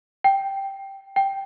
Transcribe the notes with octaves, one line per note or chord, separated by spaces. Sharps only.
G5
G5